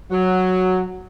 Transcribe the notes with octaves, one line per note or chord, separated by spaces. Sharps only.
F#3